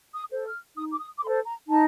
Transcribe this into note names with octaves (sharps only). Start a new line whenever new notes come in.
D#6
A4 C5
F6
D#4 D#6
D6
D#6
D6
A4 C5 C6
A#5
D#4 A5